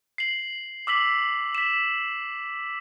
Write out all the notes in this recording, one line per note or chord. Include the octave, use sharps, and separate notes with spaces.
C7 F#7
D6 E6 B6 F#7
B6 E7